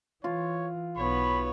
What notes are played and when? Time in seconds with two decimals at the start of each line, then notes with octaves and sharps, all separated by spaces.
0.24 E3 F4 C#5
0.97 B1 B3 C#5 B5